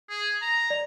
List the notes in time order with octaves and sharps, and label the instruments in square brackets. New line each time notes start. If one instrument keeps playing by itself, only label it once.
[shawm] G#4
A#5
[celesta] D5